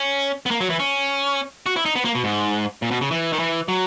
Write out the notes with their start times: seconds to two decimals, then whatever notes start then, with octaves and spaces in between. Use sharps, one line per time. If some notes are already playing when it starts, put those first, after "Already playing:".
Already playing: C#4
0.46 B3
0.51 A#3
0.61 F#3
0.70 E3
0.79 C#4
1.66 F#4
1.76 E4
1.85 D#4
1.95 B3
2.05 A#3
2.15 B2
2.24 G#2
2.82 A#2
2.91 B2
3.01 C#3
3.11 E3
3.33 D#3
3.39 E3
3.68 F#3